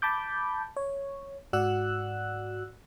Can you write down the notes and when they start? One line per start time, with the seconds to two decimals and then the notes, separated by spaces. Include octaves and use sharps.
0.02 A5 B5 D6 G6
0.77 C#5
1.53 G#2 F#4 D5 F#5 E6 F#6